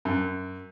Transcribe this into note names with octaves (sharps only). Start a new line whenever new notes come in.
F#2